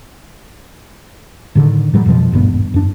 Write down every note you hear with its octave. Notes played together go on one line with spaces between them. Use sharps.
A2 D3 D#3
A2 F#3 G3
F2 B2 F3
D#1 G#1 G2 B3
F#2 D4